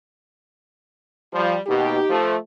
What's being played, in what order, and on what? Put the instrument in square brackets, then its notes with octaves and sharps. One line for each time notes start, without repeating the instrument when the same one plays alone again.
[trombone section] F3 [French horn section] G3
[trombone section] D#2 B2 [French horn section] D#4 G4
[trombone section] F3 A3